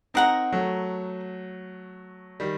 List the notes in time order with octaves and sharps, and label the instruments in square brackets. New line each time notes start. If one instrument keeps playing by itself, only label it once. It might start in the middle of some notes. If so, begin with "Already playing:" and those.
[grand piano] C4 D#4 [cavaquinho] A#4 F#5 A#5
[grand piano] F#3 A3
D#3 G3